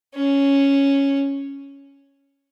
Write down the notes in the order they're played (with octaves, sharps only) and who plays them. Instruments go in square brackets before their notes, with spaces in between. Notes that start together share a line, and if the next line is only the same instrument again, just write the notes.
[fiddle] C#4